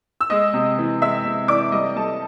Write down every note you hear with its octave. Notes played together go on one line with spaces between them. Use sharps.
E6
G#3 D#5 D#6
C3
E3
G#3 E5 E6
C3
E3 D5 D6
G3 D#5 D#6
G3 A4 A5